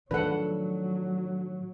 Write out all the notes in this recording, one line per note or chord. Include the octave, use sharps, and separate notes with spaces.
A2 D#3 F3 F#3 D4 A4 B4 F#5